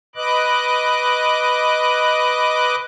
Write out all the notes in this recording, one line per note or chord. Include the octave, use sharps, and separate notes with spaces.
B4 D#5 D6 F#6